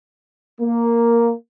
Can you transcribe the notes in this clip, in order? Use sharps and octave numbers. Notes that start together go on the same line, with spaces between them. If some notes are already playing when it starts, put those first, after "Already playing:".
A#3